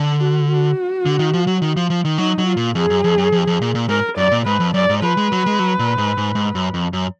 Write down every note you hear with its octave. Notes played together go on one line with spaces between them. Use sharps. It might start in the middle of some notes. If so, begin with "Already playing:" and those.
Already playing: D3
F#4
F#4
D3
D#3
F3
F#3
D#3
F3
F3
D#3
F#3 D#4
F#3
F4
A#2
F2 G#4
F#2
F2
F#2
F2
F2
A#2
A#2
G#2 A#4
F#2 D5
A#2
G#2 B4
F2
F#2 D5
G#2
F3 B4
G#3
F#3
G#3
F#3
A#2
G#2
G#2
G#2
F#2
F2
F#2